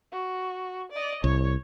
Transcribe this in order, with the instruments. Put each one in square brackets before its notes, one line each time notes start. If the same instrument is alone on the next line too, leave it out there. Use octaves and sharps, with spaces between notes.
[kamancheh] F#4
D5 D#5
[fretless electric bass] C2 [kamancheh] C#5